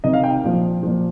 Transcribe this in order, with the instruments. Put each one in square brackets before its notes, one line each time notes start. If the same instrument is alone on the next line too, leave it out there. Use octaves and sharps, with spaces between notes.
[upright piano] C3 D#3 D#5
F5
G5
A#2 F3
A#2 F3